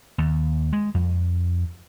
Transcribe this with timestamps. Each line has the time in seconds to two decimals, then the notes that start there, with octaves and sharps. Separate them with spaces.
0.18 D#2
0.73 G#3
0.94 F2